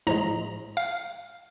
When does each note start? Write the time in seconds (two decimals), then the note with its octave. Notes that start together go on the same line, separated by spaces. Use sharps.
0.07 A2 F3 G#3 A#5
0.77 F5